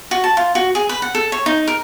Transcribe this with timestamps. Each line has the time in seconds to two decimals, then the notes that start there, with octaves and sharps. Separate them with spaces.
0.11 F#4
0.24 A5
0.37 F4
0.55 F#4
0.75 G#4
0.89 B4
1.02 F#5
1.15 A4
1.32 C#5
1.46 D#4
1.67 A#4